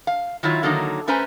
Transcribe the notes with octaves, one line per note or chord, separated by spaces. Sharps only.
F5
D#3 F#3 E4 F4 C#5
D3 D#3 F#3 A#3 D#4 F5
A3 C#4 B4 C5 G#5 A#5